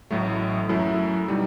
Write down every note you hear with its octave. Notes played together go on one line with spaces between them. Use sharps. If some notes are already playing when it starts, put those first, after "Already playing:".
A1 A2 F#3 A3
F#2 F#3 A3 E4
B2 G3 D#4